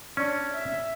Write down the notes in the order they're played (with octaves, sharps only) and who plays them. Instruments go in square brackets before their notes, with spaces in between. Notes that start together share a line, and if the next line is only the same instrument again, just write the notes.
[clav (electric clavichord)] C#4 [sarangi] D4
[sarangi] E5